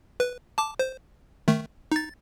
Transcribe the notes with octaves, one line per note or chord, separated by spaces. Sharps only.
B4
A5 D6
C5
D#3 A3
D#4 A6